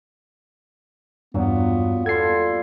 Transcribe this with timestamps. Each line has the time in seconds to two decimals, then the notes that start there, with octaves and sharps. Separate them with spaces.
1.34 E2 G2 A#2 F#3 B3
2.06 G3 D4 F4 A4 G#6 C7